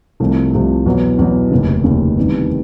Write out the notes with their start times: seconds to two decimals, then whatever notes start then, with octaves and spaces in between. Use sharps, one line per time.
0.20 C2 C3 F3 A3
0.53 C2 C3 F3 A3
0.86 E2 B2 F#3
1.18 E2 B2 F#3
1.51 F1 D#2 C#3
1.84 F1 D#2 C#3
2.17 E2 C3 D#3 G3